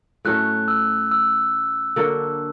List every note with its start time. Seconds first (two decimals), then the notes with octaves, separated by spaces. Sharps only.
0.25 A2 F#3 A3 C#4 F#6
0.68 E6
1.12 E6
1.96 D3 F#3 A#3 D4